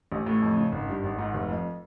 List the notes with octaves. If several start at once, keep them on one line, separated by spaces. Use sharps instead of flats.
A1
A2
F2
C#3
G#1
G2
G#1
G#2
F1
F2